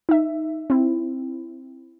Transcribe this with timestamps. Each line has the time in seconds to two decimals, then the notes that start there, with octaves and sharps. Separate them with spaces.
0.09 D#4 E5
0.70 C4 E4